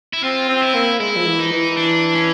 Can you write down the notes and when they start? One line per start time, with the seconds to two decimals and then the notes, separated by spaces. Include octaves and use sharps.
0.13 E4
0.23 C4 F4
0.49 C4
0.62 E4
0.74 A#3
1.00 G#3 E4
1.16 F3
1.26 E3
1.39 D#4
1.52 E3
1.77 D4
2.15 C#4